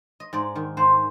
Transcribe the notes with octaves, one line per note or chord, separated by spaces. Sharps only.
D#5
G#2 D5
D#3
G#2 C5